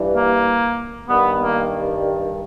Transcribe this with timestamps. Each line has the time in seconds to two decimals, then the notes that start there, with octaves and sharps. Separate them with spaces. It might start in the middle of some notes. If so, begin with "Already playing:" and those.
Already playing: G2 E3 G3
0.15 A#3
1.09 G2 D#3 G3 B3
1.40 A#3